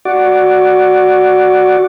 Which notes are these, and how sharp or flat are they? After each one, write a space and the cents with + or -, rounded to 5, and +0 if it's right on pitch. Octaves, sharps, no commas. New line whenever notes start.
F#4 +0 D5 +0